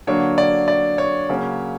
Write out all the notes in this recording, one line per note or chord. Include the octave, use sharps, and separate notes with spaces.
D3 F#3 A#3 D4 C#5
D5
D5
C#5
C#3 F#3 A#3 C#4